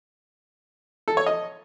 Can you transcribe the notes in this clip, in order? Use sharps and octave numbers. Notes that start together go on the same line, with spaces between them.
A4
C#5
D#5